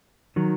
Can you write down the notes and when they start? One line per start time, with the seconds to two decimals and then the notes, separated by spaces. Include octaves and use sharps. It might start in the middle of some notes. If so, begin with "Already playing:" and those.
0.36 D#3 F#3